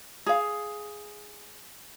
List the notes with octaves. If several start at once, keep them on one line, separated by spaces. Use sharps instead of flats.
G#4 F5